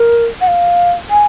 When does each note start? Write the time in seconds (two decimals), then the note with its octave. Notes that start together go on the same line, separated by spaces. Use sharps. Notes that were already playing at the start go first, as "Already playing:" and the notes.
Already playing: A#4
0.41 F#5
0.48 F5
1.10 G#5